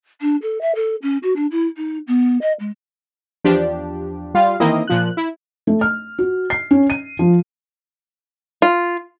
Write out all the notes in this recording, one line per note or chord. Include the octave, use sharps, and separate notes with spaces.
D4
A4
E5
A4
C#4
F#4
D4
E4
D#4
B3
D#5
G#3
E2 F3 D4 G4
G3 F4 F5
D#3 E3 A#3 C4 E4 D#5
A#2 F3 F#6
E4
A3
F6
F#4
C7
C#4
D#7
F3
F4